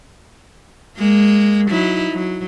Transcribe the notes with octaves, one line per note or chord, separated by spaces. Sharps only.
G#3 A#3
F#3 D#4 E4
F#3